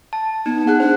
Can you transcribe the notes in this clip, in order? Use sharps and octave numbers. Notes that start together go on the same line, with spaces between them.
A5
B3 D#4
G#4 F#5 F#6
D4 C5